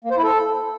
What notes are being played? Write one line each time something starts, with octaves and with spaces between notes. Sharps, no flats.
A#3
C5
E4
A4